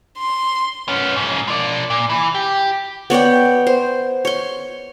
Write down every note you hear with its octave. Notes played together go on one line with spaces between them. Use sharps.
C6
B3 C#4
G#2 C#3
F3 D5
A#2
E3
G4
B3 C#5 D5 G5
C5
C#5 C6